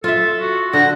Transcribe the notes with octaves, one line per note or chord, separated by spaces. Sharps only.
F4 A4 E5
F#4
D3 F#5 A#6